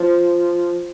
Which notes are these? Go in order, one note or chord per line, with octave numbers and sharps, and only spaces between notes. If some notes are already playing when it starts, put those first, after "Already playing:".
Already playing: F3